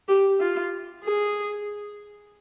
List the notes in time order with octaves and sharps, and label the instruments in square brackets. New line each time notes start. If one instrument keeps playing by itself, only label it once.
[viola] G4
F4
G#4